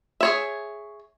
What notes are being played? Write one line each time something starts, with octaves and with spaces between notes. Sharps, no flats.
G#4 C#5 E5